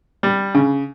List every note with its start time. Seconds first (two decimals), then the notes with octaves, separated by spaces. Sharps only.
0.23 G3
0.54 C#3